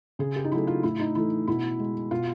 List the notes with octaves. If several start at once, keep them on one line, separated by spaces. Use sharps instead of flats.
C#3 G#4
G4
D#4
F#3 A3 E4
F4
A2 E4
D#4
E3 A3 E4
B2 E4
G#3
B2 F4